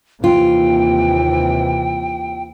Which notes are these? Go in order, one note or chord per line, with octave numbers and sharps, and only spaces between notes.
D#2 C3 E3 F4 G5